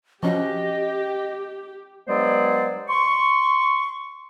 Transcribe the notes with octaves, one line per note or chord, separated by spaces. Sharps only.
F3 C#4 F#4 G4 D#5
G2 F#3 G#3 B3 C5 D5
C6 C#6